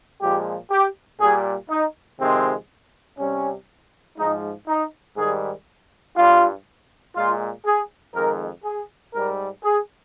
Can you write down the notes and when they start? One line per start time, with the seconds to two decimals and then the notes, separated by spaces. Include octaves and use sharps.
0.21 A#2 F3 G#3 G4
0.71 G4
1.20 A#2 G3 G#4
1.70 D#4
2.20 F2 C3 D#3 G#3 C4
3.19 C3 G3 C#4
4.18 G#2 F3 G#3 D#4
4.68 D#4
5.17 G#2 D#3 G3 G#4
6.16 G2 G3 F4
7.16 A#2 G#3 F4
7.65 G#4
8.15 F2 D#3 G#3 A#4
8.64 G#4
9.14 G#2 G3 A#4
9.63 G#4